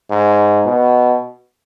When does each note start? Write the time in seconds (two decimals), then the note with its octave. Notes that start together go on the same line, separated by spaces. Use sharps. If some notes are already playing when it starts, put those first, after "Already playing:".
0.10 G#2
0.66 B2